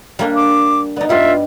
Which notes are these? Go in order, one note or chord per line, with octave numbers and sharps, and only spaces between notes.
G3 A#3 D4
D6
B3 D#4 D5
G2 G3 B3 F4 E5